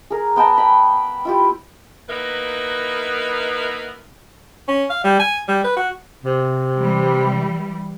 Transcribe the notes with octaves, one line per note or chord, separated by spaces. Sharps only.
G#4 A#4
B3 G5 A5 A#5
B5
E4 F4 G4
A#3 B3 D#4 E4 A#4 B4
C#4
F5
G3
G#5
G3
B4
F#4
C3
E3 G3